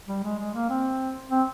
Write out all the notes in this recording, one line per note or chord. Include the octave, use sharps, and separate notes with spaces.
G3
G#3
G#3
A#3
C4
C4